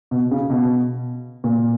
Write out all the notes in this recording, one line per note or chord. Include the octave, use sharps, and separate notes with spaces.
B2
C#3
B2
A#2